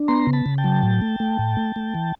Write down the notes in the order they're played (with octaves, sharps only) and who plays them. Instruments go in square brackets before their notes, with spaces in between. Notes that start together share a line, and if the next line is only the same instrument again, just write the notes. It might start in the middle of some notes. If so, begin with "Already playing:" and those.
Already playing: [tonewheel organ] D4
B3 A#5 C6
C#3
A5 B5
C#3
G5 A5
F#3
A2
A3
A3
A2
A3
A3
E3